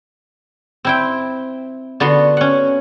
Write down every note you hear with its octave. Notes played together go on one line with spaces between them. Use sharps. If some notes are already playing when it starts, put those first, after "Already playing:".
C4 E4 G5
D3 B3 F#4 C6
C#4 F#5